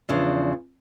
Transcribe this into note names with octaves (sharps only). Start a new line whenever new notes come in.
E2 C#3 F3 D4